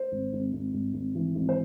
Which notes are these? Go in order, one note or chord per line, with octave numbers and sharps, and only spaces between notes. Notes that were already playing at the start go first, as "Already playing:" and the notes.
Already playing: C5
G#1
G#1
G#1
G#1
G#1
E3
G#1
C5